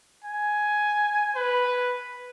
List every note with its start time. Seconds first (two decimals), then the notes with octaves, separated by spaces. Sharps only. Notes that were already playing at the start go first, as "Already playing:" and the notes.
0.25 G#5
1.36 B4